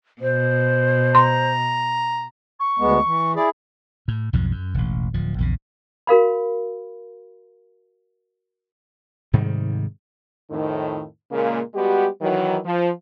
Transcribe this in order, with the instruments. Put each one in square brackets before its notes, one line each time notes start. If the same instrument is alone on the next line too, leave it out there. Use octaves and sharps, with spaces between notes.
[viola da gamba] B2 [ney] C5
[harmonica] A#5 [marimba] C6
[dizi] C#6
[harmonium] D2 G#3 B3
E3
[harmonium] E4 G#4 [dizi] D5
[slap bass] A2
B1 F2 G#2 F3
F#2
E1 A1
D1 F3
A#1 E2 C#3
[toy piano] F#4 A#4 F5 B5
[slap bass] G#2 C3 D#3 G3
[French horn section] F2 A2 D#3
A#2 C#3 G#3 A#3
G3 G#3 B3 F#4 G4
D#3 E3 F#3
F3